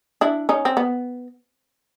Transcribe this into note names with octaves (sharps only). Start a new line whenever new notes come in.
D4 E4
C#4 D#4
C4
B3